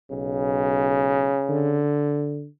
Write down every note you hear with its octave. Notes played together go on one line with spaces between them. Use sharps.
B1 C#3
D3